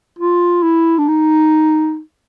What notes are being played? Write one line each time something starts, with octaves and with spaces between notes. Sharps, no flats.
F4
E4
D4
D#4